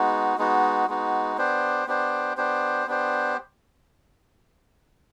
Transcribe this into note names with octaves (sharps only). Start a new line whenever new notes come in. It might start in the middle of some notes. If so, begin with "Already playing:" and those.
Already playing: G#3 B3 D#4 F#4
G#3 B3 D#4 F#4
G#3 B3 D#4 F#4
B3 D4 G4 C5
B3 D4 G4 C5
B3 D4 G4 C5
B3 D4 G4 C5